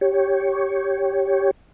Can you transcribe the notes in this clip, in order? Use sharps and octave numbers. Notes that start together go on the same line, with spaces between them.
G4 C#5